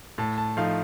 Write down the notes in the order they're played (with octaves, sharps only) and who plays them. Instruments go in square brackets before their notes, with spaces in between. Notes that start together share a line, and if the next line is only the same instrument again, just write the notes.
[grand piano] A2 A5
A5
F3 A3 D#4 F5